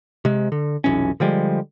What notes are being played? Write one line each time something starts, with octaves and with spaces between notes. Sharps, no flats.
C3 G#3
D3
F1 B1 E3 C#4
D3 F3 G3 G#3